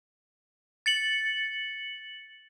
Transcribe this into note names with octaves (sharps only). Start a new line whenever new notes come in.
A6 C#7 F#7